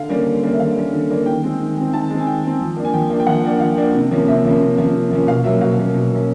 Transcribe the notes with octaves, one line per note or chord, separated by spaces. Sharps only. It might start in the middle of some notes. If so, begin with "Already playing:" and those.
Already playing: D3 F5
G3 A#3 C#4
D3
G3 A#3 C#4
E5
D3 F5
G3 A#3 C#4
D3
G3 A#3 C#4
D#3 G5
G#3 C4
D#3
G#3 C4
D#3 A5
G#3 C4
G#5
D#3 G5
G#3 C4
F3
A#3 D4
G#5
F3 G5
A#3 D4
G5
F3 F#5
A#3 D4
F3 F5
A#3 D4
C3
F3 A#3 C#4
C3 E5
F3 A#3 C#4
C3
F3 A#3 C#4
C3
F3 A#3 C#4
B2 F5
F#3 A#3 C#4 E5
B2 F5
F#3 A#3 C#4
B2
F#3 A#3 C#4